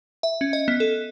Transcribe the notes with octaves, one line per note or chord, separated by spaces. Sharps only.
E5
C#4
D#5
B3
A4